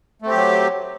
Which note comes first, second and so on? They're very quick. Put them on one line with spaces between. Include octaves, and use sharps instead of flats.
A3 C4 G4 F#3